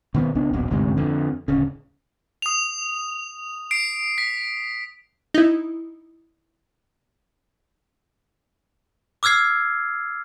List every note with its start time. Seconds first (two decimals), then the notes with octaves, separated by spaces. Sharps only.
0.15 B2 D#3 B3
0.35 C#2 B3 D4
0.53 D#1 A#1 B2
0.70 G1 D2 G#2 C3
0.97 F2 D3
1.48 D1 C#3
2.42 D#6 F7
3.71 C7 D7
4.18 B6
5.34 D#4 E4
9.23 D6 E6 F6 G#6 C7